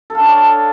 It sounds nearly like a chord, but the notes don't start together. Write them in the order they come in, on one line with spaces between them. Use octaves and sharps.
A4 F5 D4 C#5